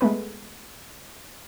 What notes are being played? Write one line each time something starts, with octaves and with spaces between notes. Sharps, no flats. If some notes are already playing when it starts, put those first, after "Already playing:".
G#3 A3 B3 B4